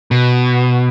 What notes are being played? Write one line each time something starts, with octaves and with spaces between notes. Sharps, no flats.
B2